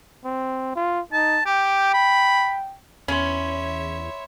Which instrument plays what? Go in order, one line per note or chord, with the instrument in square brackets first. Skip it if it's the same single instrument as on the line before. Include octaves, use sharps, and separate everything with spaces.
[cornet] C4
F4
[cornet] D#4 [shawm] A5
[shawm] G4 [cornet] G5
[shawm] B5
[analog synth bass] E2 [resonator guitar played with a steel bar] C#4 [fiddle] C#5 E5 [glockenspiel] B5 C6